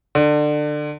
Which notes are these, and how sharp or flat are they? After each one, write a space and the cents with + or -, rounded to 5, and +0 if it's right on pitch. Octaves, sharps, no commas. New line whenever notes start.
D3 +25